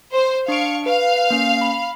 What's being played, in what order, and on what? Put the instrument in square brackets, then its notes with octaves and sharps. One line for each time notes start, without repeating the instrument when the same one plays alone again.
[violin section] C5
[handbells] D4 D7 [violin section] F5 C#6
[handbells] B4 [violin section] F5
[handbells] A#3 C#4
B5